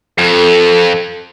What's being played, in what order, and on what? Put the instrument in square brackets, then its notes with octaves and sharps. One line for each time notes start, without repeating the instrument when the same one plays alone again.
[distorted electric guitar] F2 [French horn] A4